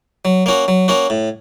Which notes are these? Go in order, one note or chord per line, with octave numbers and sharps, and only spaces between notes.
F#3
A#3 C#4 F#4
F#3
A#3 C#4 F#4
A2